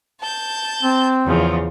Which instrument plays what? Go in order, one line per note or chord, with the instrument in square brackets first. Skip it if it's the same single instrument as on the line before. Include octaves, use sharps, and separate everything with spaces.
[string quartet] A5 G6
[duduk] C4
[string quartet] E2 C#3 F3